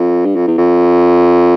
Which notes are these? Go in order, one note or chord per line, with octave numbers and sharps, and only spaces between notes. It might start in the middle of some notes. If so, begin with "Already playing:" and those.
Already playing: F2
G2
F2
E2
F2